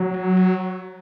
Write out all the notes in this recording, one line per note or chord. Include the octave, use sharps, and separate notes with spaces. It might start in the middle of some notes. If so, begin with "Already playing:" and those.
Already playing: F#3